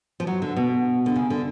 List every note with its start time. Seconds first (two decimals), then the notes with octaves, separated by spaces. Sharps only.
0.20 F3
0.27 F#3
0.42 D3
0.56 B2
1.06 D3
1.16 C#3
1.30 D3